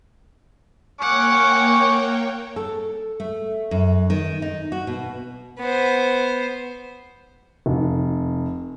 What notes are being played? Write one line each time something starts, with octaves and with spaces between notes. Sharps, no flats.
A#3 C#4 C#5 F#5 G5 C#6 D6
A4
A3
F#2
D#3
D#4
F#4
B2
B3 C5
F1